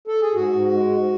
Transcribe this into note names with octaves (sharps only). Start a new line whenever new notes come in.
A4
G#4
G#2 F#4
G#2
G#3
G#2